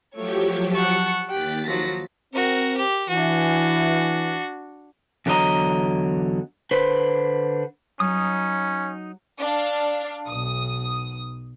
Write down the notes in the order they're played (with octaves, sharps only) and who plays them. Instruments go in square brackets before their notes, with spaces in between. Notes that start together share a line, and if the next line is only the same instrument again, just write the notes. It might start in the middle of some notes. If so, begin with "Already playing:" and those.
[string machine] F3 F#3 G4 [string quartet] A3 C#5
[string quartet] F#5 A5 C#6
[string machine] D#2 A6 B6 [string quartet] G4 G5 F#6
[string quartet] F3 F#3 A#6
[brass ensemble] C4 [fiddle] F#4 A#4
[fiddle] G4
[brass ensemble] E3 [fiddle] D4 F#4
[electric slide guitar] E2 D3 F#3 C4 D#5 A#5
D3 B4 C5
[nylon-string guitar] F#3 [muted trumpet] C#4 [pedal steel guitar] D#4 D#6
[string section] D4 F5
B1 D#6